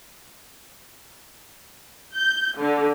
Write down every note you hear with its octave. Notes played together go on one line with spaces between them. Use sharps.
G6
D3